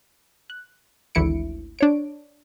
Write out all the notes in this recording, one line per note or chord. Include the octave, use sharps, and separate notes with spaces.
F#6
G#1 D2 E3 E4 C#7 D7
D4 C#5 D7